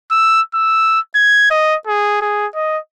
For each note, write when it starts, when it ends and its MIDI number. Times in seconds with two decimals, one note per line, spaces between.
0.11 0.41 88
0.54 1.00 88
1.15 1.49 92
1.50 1.76 75
1.87 2.21 68
2.21 2.46 68
2.55 2.78 75